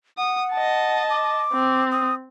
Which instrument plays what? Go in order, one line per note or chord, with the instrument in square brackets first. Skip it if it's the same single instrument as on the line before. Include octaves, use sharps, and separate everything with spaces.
[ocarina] F#5 [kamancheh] D#6
[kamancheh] D#5 A5
[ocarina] D6
[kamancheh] C4
[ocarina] D#6